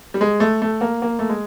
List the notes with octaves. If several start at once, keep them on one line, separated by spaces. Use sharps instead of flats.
G3
G#3
A3
A3
A#3
A#3
A3
G#3